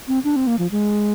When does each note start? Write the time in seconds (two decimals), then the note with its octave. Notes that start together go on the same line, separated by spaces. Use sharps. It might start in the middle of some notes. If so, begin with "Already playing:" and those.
0.08 C4
0.25 D4
0.36 C4
0.47 A#3
0.59 F3
0.71 G#3